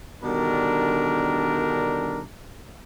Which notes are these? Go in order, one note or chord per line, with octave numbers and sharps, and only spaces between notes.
B2 D3 D#3 G3 D4 A#4